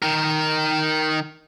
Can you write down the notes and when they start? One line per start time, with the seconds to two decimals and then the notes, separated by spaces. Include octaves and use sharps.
0.02 D#3 A#4